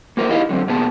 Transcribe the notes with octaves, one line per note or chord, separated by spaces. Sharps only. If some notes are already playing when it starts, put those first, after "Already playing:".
A#3 F#4 A#4 C5 E5
D#4 E4 G4 D#5 F5
D3 F#3 A#3 C4
B2 A#3 B3 G#4 A5